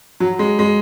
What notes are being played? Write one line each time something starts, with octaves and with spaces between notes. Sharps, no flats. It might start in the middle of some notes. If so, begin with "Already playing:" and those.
F#3
G#3
G#3